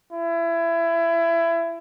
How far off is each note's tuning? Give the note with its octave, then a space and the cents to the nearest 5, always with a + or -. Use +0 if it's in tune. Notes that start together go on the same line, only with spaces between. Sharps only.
E4 +25